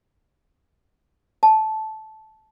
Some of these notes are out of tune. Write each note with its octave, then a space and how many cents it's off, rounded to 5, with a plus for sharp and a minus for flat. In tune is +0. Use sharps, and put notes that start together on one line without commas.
A5 -15